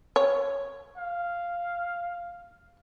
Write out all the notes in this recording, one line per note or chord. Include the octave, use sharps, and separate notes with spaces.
C#5
F5